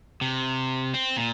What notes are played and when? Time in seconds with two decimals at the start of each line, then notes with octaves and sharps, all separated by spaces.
0.21 C3
0.94 C4
1.17 A#2